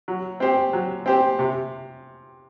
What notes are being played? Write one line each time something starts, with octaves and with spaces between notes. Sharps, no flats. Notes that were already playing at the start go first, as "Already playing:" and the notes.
F#3
C4 G4 C5
F#3
C4 G4 C5
C3